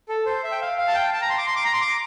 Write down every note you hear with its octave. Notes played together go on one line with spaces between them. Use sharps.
A4
C5
E5
G5
F5
F5
A5
G5
A5
A#5
C6
D6
C6
D6
A#5
C6
D6